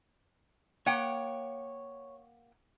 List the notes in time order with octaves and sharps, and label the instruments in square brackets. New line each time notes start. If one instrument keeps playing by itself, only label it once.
[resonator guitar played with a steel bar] A#3 F#5 G5 [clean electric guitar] C#5